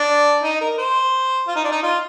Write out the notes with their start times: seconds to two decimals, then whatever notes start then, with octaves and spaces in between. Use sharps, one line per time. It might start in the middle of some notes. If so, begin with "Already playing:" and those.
Already playing: D4
0.43 D#4
0.61 A#4
0.78 C5
1.48 F4
1.56 D#4
1.64 D4
1.72 D#4
1.83 F4